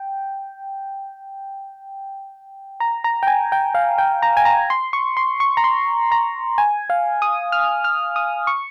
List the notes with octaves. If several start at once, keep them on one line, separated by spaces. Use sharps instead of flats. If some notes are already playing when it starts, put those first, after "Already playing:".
Already playing: G5
A#5
A#5
G5
G#5
G5
F5
G5
A#5
G#5
A#5
C6
C#6
C6
C#6
A#5
C6
A#5
G#5
F5
D#6
F6
F6
D#6
C#6